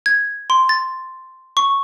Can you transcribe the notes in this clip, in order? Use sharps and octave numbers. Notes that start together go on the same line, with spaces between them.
G#6
C6
A6
C#6